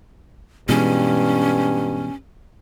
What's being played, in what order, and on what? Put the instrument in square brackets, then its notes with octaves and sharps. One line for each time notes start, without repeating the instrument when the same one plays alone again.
[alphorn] G2 [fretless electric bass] B2 E3 G#3 [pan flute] C#4